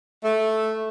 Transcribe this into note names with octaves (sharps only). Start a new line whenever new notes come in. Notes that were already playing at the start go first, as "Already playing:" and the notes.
A3